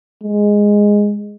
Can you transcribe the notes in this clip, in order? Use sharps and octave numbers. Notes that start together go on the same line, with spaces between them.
G#3